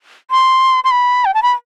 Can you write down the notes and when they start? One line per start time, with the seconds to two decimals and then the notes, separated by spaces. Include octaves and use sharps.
0.31 C6
0.84 C6
0.91 B5
1.25 G5
1.34 A5
1.43 B5